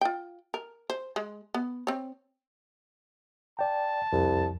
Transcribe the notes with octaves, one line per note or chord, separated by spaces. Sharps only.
F4 G5
A#4
C5
G#3
B3
C4 C#5
D5 G5 A5
C2 F2